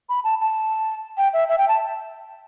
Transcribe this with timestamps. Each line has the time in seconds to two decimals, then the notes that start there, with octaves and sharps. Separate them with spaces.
0.09 B5
0.24 A5
0.40 A5
1.18 G5
1.33 E5
1.49 E5
1.58 G5
1.68 A5